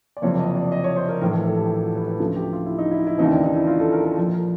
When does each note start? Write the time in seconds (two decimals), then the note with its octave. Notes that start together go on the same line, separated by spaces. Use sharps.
0.17 D5
0.22 F#1 F2 C3 C#5
0.39 D#5
0.55 D5
0.72 D#5
0.84 C#5
0.96 C5
1.08 A#4
1.21 A#1 A2 E3 A#4
1.34 A4
1.46 A4
1.58 G4
1.70 G4
1.83 F#4
1.95 B4
2.07 B4
2.20 D2 C#3 F3 A4
2.36 G4
2.53 F4
2.66 E4
2.78 D#4
2.91 E4
3.07 E4
3.18 D#2 C#3 E3 D#4
3.30 D4
3.43 D#4
3.56 E4
3.67 F4
3.80 A4
3.93 A#4
4.05 A4
4.17 A#1 A#2 F3 A4
4.33 A#4